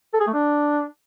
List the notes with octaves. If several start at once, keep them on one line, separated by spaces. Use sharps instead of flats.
A4
G#4
A3
D4